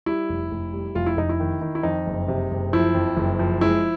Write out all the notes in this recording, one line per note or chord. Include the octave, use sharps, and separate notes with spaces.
G3 E4
F1
F1
G3
F1 F4
E4
F1 D#4
E4
D#3
D#3
E4
F2 D#4
F#1
C3
F#1
F3 E4
F2
F#1
F3
G#3 E4